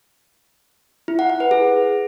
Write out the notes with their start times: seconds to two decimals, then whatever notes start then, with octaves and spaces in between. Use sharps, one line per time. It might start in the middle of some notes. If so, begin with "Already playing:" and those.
1.08 E4
1.19 F#5
1.30 F#5
1.40 B4
1.51 G#4